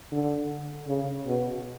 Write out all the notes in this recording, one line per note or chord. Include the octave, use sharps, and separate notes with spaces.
D3
C#3
B2